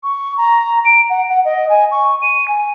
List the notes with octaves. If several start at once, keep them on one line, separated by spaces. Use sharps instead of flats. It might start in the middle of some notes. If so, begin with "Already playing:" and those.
C#6
A#5
D7
F#5
F#5
D#5
G#5
C#6
D#7
G#5